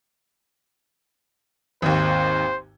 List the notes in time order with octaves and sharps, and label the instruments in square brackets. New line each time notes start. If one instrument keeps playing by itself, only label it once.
[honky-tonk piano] G#1 D#2 [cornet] C5